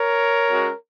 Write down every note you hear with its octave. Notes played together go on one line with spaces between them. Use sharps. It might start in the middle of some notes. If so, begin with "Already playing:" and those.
Already playing: A#4 C#5
G#3 C#4 F#4